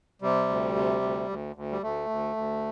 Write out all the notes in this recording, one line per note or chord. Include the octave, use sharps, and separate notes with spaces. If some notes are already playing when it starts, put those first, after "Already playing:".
C3 G3
D2
C3
D2
D2
D2
G3
D2 A3
D2
D2